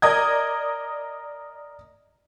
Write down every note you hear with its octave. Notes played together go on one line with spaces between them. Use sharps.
A#4 D5 D#5 D#6 G#6